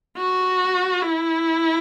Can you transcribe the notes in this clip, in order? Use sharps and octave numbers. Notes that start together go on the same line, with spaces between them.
F#4
E4